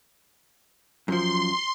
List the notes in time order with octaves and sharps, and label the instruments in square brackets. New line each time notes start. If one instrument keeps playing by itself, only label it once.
[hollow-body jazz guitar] F#2 F3 [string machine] C6